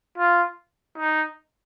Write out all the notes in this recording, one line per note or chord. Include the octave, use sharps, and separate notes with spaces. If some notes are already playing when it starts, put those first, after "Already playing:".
F4
D#4